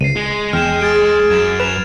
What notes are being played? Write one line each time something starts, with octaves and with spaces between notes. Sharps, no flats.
C#2 C7 D#7
G#3
E2 G5 F6 E7
G#4 A6 D7
F#2 G#6 E7
B4 E7 F7